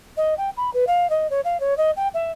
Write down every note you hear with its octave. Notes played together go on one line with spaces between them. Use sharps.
D#5
G5
B5
B4
F5
D#5
C#5
F5
C#5
D#5
G5
E5